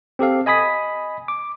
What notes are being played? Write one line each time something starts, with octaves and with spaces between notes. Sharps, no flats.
C4 G4 A4 F5
D#5 G#5 B5 D#6 B6
D6